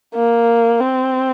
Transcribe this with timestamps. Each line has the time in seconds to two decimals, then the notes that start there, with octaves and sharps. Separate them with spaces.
0.15 A#3
0.80 C4